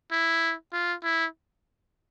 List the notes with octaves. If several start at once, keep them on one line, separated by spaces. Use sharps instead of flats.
E4
F4
E4